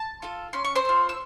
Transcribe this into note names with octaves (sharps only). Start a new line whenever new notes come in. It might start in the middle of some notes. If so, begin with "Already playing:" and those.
Already playing: A5
F4 A4
C#4 C6
C#6
C5 C6
F4 A4
E6